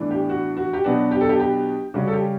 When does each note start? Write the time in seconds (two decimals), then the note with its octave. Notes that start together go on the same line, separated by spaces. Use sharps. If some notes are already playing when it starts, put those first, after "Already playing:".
Already playing: A2 E3 B3 D4
0.11 G4
0.29 F#4
0.57 F#4
0.73 G4
0.84 B2 F#3 B3 D4 F#4
1.11 G4
1.21 A4
1.29 G4
1.40 G4
1.94 C#3 G3 C#4 F#4
2.07 A4
2.13 G4